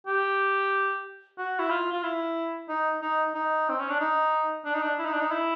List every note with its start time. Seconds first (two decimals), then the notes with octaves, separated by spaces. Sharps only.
0.07 G4
1.38 F#4
1.59 E4
1.70 F4
1.92 F4
2.03 E4
2.69 D#4
3.01 D#4
3.35 D#4
3.69 C4
3.79 C#4
3.90 D4
4.00 D#4
4.65 D4
4.74 D#4
4.83 D4
4.98 E4
5.05 D#4
5.13 D4
5.20 D#4
5.31 E4